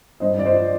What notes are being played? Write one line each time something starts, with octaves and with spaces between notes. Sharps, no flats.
G2 C5 D#5
D5
F3 C5 D#5